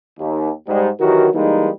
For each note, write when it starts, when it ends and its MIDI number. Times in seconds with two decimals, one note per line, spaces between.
0.19 0.50 39
0.67 0.88 44
0.67 0.88 55
1.00 1.28 51
1.00 1.28 52
1.00 1.28 54
1.00 1.28 66
1.00 1.28 67
1.00 1.28 70
1.34 1.69 52
1.34 1.69 55
1.34 1.69 56
1.34 1.69 58
1.34 1.69 63